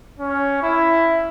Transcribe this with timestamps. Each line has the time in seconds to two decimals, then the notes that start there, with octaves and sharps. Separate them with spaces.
0.19 C#4
0.62 E4